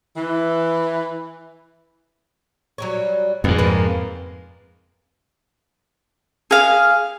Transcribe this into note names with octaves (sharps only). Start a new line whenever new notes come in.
E3
F#3 G3 C#5
F2 G#2 B2 B4
C#3 A#3 B4
G#4 F5